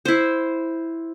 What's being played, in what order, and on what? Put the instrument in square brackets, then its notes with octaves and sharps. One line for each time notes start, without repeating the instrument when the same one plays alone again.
[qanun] E4 C5